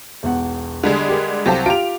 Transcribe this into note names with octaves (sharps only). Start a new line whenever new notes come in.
E1 B1 F#5
D3 G3 G#3
G4 A#4
C2 F#3 G4 A4 C5 F5
F4 G4 D7 F7